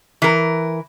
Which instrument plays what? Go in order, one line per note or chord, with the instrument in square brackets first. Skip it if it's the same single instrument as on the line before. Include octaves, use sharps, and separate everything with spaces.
[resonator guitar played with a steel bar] E3 A#4